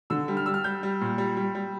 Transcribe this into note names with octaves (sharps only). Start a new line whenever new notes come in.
D3 E6
G3
F6
G3 E6
F6
G3 G6
G3
A#2
G3
G3
G3